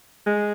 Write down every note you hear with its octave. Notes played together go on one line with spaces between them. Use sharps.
G#3